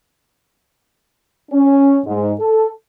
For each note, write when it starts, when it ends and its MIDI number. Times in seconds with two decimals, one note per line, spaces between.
1.52 1.99 61
2.06 2.34 44
2.39 2.70 69